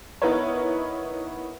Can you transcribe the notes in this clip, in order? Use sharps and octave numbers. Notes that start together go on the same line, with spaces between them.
B3 D#4 E4 A#4 B4 C#5